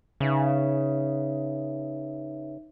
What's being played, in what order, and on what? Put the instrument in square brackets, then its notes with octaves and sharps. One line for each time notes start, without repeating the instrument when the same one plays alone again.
[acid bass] C#3 [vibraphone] D#4 B4 E5